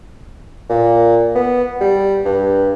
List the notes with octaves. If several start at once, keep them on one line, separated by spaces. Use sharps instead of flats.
A#2
B3
G3
G2